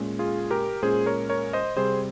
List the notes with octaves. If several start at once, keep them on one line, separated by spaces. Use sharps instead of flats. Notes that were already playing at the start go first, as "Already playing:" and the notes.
Already playing: A#2 G#3 C#4
F4 G#4
G4 A#4
A#2 G#3 C#4 G#4 C5
A#4 C#5
A#4 C#5
C5 D#5
C3 G3 C4 G#4 C5